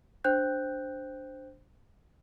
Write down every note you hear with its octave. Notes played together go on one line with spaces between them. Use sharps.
D4 C5 G5 F#6 G6